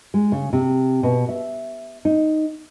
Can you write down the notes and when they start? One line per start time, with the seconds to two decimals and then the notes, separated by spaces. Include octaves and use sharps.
0.14 G#3
0.32 C#3
0.53 C3
1.03 B2
1.29 E5
2.05 D#4